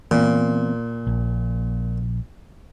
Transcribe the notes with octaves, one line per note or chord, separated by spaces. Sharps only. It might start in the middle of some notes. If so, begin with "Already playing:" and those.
A#2 E3 B3 C4
A#1